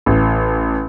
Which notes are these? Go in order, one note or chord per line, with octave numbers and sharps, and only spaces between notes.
A1